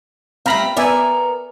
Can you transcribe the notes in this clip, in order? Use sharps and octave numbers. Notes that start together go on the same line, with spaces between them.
G3 A3 C4 F5 A#5 B5
B3 A4 A#4 D5 E5 G#5